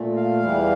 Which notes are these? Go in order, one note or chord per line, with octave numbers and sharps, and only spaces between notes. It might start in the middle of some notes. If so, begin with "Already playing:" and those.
Already playing: A#2 A3
F5
E2 E3 G3